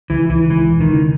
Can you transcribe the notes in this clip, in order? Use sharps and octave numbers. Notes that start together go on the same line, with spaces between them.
C#2 E3
C#2 E3
E3 G#3
E1
D#3
C#3